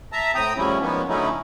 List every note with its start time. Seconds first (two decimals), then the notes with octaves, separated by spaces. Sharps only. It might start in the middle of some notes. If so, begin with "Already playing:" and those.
0.12 E5 A5 A#5
0.35 A2 C4 G5 A#5 D#6
0.57 A2 C#3 F3 G3 C#4 E4
0.81 D#3 F3 G#3 A#3 B3 C#4
1.09 D3 F#3 A3 C#4 D#4 E4